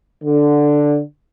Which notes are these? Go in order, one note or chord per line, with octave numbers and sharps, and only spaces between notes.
D3